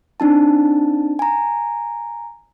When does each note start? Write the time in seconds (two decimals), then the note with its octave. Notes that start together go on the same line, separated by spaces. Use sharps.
0.20 C4 D4 D#4 A5
1.19 G#5 A#5